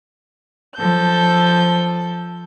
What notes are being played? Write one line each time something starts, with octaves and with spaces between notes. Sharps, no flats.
F3 A4 G6